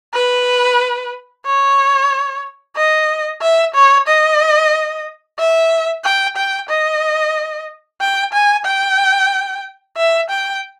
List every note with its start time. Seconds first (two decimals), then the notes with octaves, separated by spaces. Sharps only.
0.14 B4
1.45 C#5
2.76 D#5
3.41 E5
3.75 C#5
4.07 D#5
5.39 E5
6.04 G5
6.37 G5
6.69 D#5
8.01 G5
8.33 G#5
8.66 G5
9.97 E5
10.30 G5